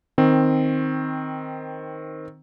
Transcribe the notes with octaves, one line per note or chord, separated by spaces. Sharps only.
D#3 C4